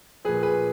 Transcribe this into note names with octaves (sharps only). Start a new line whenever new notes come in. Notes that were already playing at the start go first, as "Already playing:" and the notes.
A#2 F3 G#4 B4
G#4 B4